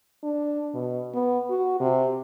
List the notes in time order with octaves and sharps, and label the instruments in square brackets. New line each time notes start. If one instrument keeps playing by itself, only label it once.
[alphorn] D4
B2
B3
F#4
C3